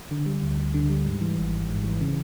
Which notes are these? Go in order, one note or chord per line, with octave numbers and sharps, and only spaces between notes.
D3
G3
D2
D2
D3
G3
G#2
E3
G#1
G#1
G#2
E3
C#3